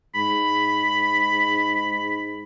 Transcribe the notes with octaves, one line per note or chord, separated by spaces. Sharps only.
G#2 B5